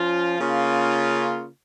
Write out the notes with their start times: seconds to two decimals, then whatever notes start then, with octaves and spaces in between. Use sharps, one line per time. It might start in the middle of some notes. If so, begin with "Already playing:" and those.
Already playing: F3 C#4 F4
0.39 C#3 A#3 C#4 F4